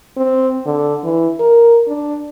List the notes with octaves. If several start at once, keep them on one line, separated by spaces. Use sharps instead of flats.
C4
D3
E3
A#4
D4